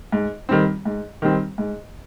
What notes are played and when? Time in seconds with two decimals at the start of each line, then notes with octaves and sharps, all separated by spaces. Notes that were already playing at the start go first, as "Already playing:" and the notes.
0.12 G#2
0.49 D#3 G3 C4
0.85 G#2
1.22 D#3 G3 C4
1.58 G#2